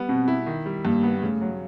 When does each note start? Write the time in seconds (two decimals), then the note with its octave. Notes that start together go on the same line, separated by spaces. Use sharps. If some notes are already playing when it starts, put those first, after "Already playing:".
Already playing: G3 B3
0.09 B2 C4
0.28 E4
0.46 D#3
0.66 G3
0.85 G2 A#3
1.03 B3
1.22 C#3 A3
1.41 F#3